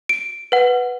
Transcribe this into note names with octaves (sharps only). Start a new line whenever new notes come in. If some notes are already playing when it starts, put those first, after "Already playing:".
D7
B4 F#5